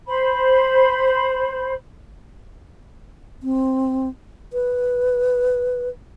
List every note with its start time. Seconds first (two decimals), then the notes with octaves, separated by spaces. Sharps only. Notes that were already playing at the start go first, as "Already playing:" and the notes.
0.07 C5 B5
3.41 C4
4.53 B4